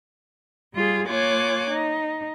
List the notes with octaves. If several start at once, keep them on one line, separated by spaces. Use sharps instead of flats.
G3 F4 G#4
A#3 F4 C#5 G#5 D6 F#6
D#4